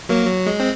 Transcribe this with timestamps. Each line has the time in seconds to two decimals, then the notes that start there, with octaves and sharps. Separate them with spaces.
0.09 F#3 A#3
0.25 F#3
0.47 G#3
0.60 C4